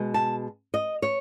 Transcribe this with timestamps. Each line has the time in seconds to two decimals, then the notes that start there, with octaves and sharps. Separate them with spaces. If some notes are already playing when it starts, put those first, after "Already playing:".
Already playing: B2 G#3
0.14 A5
0.74 D#5
1.02 C#5